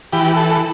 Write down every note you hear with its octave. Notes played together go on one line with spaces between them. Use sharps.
E3 G4
A4